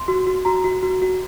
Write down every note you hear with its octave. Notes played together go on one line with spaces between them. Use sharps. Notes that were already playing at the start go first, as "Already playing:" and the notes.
Already playing: C6
F#4
F#4
F#4 A#5
F#4
F#4
F#4